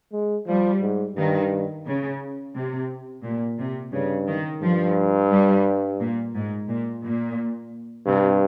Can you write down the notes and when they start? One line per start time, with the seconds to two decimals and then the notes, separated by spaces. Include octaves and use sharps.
0.12 G#3
0.47 F3 G3
0.82 G#2
1.16 G2 D#3
1.86 C#3
2.55 C3
3.23 A#2
3.58 C3
3.92 G2 C#3
4.27 D#3
4.61 G2 F3
5.31 G3
5.99 A#2
6.34 G#2
6.68 A#2
7.03 A#2
8.06 G2 C3